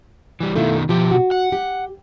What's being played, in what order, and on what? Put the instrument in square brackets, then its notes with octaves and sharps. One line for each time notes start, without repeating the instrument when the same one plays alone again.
[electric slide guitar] E3 G3
[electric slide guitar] B2 D#3 [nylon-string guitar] A3 E4 F4
[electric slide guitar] B2 G4 [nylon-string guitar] F3
[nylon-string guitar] F#4
[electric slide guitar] F#5
[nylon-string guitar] G4